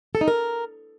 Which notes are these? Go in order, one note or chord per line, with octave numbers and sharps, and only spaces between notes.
A4
D#4
A#4